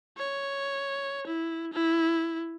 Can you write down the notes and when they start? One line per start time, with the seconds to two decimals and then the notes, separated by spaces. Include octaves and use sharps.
0.17 C#5
1.27 E4
1.73 E4